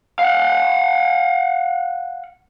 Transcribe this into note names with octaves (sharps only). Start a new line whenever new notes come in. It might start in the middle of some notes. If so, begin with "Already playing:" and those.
F5 F#5